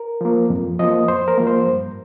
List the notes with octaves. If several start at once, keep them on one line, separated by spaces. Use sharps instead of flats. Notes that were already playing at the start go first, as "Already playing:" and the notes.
Already playing: A#4
F3 A#3
F2
F3 A#3 D#5
F2 C5
A#4
F3 A#3
C5
G2